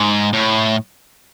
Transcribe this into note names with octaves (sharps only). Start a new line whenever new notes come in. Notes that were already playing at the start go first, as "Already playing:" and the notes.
Already playing: G#2
A2